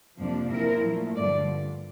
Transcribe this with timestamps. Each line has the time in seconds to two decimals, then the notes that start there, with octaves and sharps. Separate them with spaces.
0.18 F2 C3 F3 A#3 D4
0.51 A#2 F3 C4 E4 A#4
0.84 A#2 F3 A3
1.16 G2 D3 F3 D5